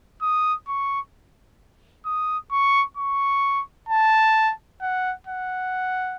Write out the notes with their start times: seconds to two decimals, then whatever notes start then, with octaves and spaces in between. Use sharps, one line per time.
0.22 D#6
0.68 C#6
2.06 D#6
2.52 C#6
2.97 C#6
3.89 A5
4.81 F#5
5.27 F#5